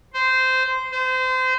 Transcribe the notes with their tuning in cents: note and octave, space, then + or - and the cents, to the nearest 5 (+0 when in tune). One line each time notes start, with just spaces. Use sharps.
C5 -15
C5 -30